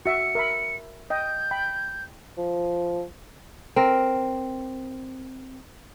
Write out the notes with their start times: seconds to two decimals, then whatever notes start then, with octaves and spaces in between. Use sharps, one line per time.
0.06 F#4 E5 C#7
0.35 A#4 E5 B5
1.10 D#5 G5 G6
1.51 G5 B5
2.38 F3
3.76 C4 A#4